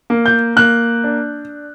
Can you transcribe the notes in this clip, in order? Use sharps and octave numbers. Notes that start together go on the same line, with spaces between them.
A#3
G6
A#3 F#6
D4